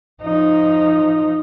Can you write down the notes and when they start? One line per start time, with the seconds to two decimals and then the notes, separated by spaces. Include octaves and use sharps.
0.22 F3 D#4